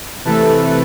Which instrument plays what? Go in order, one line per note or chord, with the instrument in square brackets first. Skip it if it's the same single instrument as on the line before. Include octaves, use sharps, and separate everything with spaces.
[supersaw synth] C3 E3 A3 A4 B4